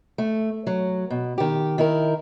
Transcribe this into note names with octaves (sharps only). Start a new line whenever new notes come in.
A3
F#3
B2
D#3 G4
D#3 E4 A#4